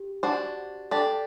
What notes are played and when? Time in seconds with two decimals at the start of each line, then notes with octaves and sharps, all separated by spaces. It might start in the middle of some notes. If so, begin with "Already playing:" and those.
Already playing: G4
0.23 D4 F#4 C5
0.91 D4 G4 A4 D5